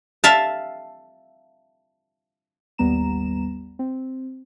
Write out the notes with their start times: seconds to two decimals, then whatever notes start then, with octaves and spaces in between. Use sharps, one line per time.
0.24 E5 F5 A5
2.78 G#1 D#2 G3 B3 A#5 E7
3.79 C4